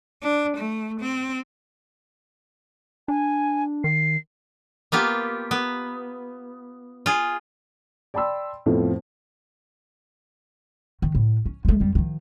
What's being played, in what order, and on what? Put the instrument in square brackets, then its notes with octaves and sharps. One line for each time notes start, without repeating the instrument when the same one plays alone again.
[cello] D4
A3
C4
[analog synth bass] D4 [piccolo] G#5
[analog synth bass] D#3 [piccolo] C7
[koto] A#3 B3 F4 G4
B3
F4 G#4
[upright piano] D5 G5 A5 B5 C6 E6
F2 A2 F3 A3 B3 C4
[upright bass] D#3
A2
C#4
G#3 A3
F2 G3
D#3 F3